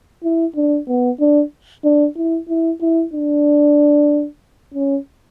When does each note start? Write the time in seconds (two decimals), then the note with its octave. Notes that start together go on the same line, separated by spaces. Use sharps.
0.24 E4
0.56 D4
0.88 B3
1.20 D4
1.84 D4
2.17 E4
2.49 E4
2.81 E4
3.14 D4
4.75 C#4